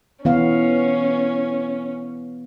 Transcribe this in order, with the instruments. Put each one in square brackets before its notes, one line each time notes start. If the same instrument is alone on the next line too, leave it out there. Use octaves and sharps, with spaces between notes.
[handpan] E3 B3 F5 [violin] C#4